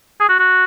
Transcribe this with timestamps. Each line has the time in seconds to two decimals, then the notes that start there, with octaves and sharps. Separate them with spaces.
0.20 G#4
0.29 F#4
0.39 F#4